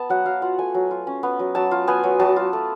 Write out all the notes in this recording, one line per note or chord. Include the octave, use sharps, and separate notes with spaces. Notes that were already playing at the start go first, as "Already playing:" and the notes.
Already playing: B3 A5
F#3 F#5
F#3 F5
F4 F#5
A3 G#5
F#3
F4
C#4
B3
F#3
F#3 A5
F4
B3 G#5
F#3
F#3 A5
F4
A3